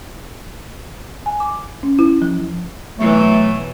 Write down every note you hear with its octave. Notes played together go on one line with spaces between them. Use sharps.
G#5
D6
C#4
E4
F3
B2 E3 F#3 A3